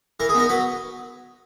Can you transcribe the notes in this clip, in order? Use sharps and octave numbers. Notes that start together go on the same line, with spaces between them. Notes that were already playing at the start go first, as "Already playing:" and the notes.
E3 A#4
G#4
B3 D#4 A#4
F#3 B4